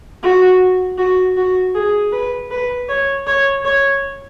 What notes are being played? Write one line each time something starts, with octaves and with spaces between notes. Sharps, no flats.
F#4
F#4
F#4
G#4
B4
B4
C#5
C#5
C#5